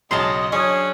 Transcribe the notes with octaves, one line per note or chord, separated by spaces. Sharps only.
B1 C#3 F#3 D#5 A5 A#5 C6
F#3 C#4 D4 G#4